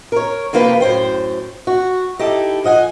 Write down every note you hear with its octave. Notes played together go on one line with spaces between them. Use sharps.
A#4 C#5
C3 F3 A#3 F4 B4 G5
F#2 A2 C5 G5
F#4
D#4 E4 G4 A4
F3 D#5 F#5 G#5